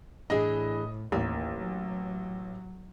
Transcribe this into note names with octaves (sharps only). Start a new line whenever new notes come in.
A2 E3 D4 G#4 D#5 D#6
A1 D#2 A#3
F#3